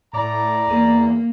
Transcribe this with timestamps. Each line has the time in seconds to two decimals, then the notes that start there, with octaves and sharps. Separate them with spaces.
0.13 A2 D5 A#5
0.67 E2 A#3